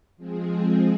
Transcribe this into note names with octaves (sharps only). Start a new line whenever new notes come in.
F3 G#3 C4 G#4